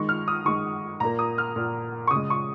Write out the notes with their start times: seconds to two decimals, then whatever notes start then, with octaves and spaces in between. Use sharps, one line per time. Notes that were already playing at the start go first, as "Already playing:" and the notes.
Already playing: D#3 G#3 C#6
0.09 F6
0.28 D#6
0.45 D#3 G#3 C#6
1.00 A#2 A#3 A#5
1.19 D#6
1.38 F6
1.56 A#2 A#3
2.07 C#6
2.11 C#3 D#6
2.16 G#3
2.30 C#6